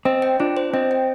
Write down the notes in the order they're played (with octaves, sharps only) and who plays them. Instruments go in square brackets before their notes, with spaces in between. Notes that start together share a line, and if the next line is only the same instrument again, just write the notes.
[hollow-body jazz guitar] C4 [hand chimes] D#5
[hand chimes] G5
[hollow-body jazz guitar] D4 [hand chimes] F4
[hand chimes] C5
[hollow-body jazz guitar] C4 [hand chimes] D#5
[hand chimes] G5